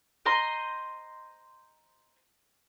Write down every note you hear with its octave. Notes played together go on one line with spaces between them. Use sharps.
C5 D#5 A#5 C6